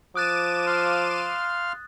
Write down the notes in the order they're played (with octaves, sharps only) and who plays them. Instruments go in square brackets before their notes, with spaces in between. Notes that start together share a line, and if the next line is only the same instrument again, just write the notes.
[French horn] F3 [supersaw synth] D6 D#7 E7 [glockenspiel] D#6 F#6 A6
[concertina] F5 C6 F6